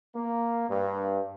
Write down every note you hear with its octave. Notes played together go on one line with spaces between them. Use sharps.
A#3
G2